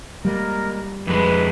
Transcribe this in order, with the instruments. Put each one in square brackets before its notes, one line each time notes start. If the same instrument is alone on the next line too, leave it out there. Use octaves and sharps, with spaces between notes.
[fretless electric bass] G3 [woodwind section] G#3 A#3 A#4
[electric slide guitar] F2 G#3 [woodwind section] B4